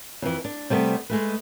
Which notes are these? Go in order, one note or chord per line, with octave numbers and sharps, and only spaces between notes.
F2 E3
D4
C3 G3 A3 B3
G#3 A3 B4